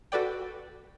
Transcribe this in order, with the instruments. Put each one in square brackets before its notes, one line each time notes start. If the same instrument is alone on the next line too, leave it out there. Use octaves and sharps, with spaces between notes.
[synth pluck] F#4 A4 B4 D5 G5